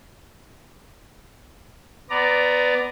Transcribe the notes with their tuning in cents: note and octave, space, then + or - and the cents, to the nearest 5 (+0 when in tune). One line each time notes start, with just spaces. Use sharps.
B3 +20 D5 +0 A#5 +0